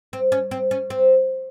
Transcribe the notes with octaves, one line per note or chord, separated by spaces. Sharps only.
C4
C#4
C4
C#4
C4